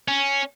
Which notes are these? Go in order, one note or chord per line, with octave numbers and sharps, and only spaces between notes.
C#4